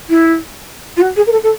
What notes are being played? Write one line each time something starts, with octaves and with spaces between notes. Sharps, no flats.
E4
F4
F#4
G#4
A#4
A4
A4